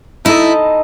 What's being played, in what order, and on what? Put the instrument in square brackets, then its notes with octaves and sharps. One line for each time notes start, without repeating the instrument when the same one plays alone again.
[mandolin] D#4 A4 D#5 [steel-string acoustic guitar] E4